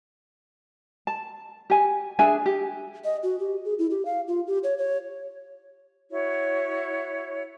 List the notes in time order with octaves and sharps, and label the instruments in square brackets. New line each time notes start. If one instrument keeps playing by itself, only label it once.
[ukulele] A5
G4 G#5
D4 G#4 E5 G#5
G4
[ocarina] D#5
F#4
G4
G#4
E4
G4
F5
F4
G4
C#5
C#5
[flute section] E4 F#4 C#5